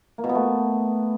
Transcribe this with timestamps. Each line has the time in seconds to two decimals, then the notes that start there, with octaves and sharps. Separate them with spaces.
0.18 A#3
0.24 B2
0.29 B3
0.35 A3